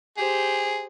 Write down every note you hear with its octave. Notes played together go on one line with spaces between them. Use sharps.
G4 G#4 C5